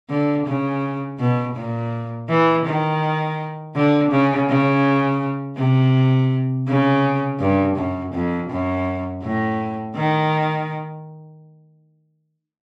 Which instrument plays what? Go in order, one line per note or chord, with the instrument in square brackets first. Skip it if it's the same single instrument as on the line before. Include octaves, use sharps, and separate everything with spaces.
[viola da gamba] D3
C#3
B2
A#2
E3
D#3
D3
C#3
C#3
C3
C#3
G2
F#2
F2
F#2
A2
D#3